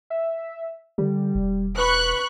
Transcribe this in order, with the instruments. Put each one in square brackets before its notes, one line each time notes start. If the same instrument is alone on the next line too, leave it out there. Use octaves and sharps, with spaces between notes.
[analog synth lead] E5
[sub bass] D3 [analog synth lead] G3
[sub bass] E1
[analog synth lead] B4 [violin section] B5 C#6 F#6